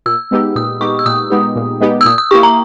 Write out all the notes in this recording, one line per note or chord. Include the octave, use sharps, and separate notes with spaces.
A#2 E6
G#3 B3 D#4 G4
A#2 D#6
G#3 B3 D#4 G4 C#6
E6
A#2 D#6
G#3 B3 D#4 G4
A#2
G#3 B3 D#4 G4
E6
A#2 D#6
D#6
A#3 E4 G4 C#6
A#5